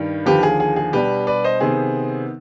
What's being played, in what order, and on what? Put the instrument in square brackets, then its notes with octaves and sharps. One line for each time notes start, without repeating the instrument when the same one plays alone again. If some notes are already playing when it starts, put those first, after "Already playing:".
Already playing: [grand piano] G2 D#3 G3
D#2 D3 F3 G4 B4
G#4
G#4
G#4
B2 G3 D4 G4 B4
B4 D5
C5 D#5
C3 D#3 B3 G#4 C5